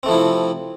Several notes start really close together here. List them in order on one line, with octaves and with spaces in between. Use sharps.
C4 A3 F3 E4 C3